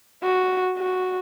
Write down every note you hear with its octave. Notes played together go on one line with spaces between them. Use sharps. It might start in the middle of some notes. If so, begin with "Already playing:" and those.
F#4
F#4